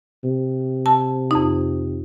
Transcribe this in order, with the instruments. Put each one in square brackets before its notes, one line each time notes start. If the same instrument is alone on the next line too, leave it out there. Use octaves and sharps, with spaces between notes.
[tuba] C3
[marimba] A5
F2 D#4